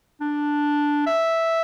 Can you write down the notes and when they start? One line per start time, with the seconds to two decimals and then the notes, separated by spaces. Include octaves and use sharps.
0.21 D4
1.07 E5